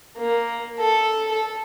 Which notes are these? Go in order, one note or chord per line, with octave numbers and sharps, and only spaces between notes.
A#3
A4
A4